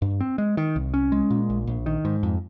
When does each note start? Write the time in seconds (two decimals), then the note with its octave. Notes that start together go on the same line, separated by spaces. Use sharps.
0.02 G2
0.21 C4
0.38 G#3
0.57 D#3
0.76 C2
0.94 C#4
1.12 G#3
1.30 A#2
1.50 A#1
1.67 A#1
1.86 D#3
2.05 G#2
2.23 F2